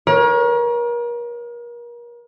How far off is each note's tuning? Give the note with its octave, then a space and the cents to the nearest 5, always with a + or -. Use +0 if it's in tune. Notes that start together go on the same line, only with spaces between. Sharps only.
A#4 +35 C#5 -5